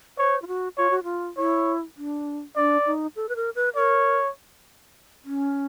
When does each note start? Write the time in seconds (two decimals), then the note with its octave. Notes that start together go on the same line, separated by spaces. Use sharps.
0.18 C5 C#5
0.42 F4
0.48 F#4
0.78 F4 C#5
0.90 F#4
1.04 F4
1.37 E4 C#5
1.97 D4
2.56 D4 D5
2.86 D#4
3.16 A4
3.29 B4
3.36 A#4
3.55 B4
3.75 A#4 C#5
5.25 C#4